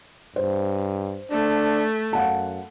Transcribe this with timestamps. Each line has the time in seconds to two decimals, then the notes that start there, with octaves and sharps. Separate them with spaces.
0.36 G2 C5
1.31 A3 D4
2.13 F#2 F5 F#5 A5